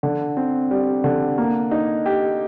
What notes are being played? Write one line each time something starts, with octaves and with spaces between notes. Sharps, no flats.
D3
C4
G3
D3
A#3
D#4
G4